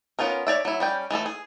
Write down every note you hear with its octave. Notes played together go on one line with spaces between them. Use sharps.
B3 C#4 F4 G#4 A#4
C#5 D5 E5
F#3 E4
G3 C#4 G5
E3 A3 G#4 A4
G#4